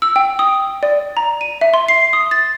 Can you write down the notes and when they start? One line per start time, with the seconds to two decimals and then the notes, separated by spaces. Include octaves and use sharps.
0.02 E6
0.16 G5
0.39 D#6
0.83 D5
1.17 A#5
1.41 D#7
1.61 E5
1.74 C6
1.88 C7
2.13 D#6
2.31 A6